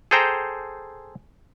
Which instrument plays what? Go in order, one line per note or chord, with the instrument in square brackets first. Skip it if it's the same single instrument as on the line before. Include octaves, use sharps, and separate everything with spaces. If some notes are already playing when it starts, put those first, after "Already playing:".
[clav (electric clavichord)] G#4 A4 C5 G5 A#5